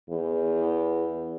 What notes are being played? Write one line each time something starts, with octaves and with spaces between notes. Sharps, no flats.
E2